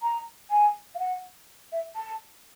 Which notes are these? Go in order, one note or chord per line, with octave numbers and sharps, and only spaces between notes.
A#5
G#5
F5
F#5
E5
A5